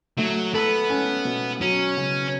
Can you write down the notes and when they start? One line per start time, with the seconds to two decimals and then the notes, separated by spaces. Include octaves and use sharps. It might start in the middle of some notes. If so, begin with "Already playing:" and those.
0.18 F#3 A3
0.54 B3 A4
0.90 C#4
1.25 B2
1.61 F#3 C#4
1.97 C#3